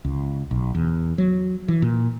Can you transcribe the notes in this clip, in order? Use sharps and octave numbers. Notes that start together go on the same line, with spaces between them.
C#2
B1
E2
F#3
E3
A#2